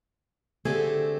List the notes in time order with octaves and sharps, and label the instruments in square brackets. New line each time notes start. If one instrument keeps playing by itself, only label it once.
[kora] D3 G#4 [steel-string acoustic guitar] A3 C4 G4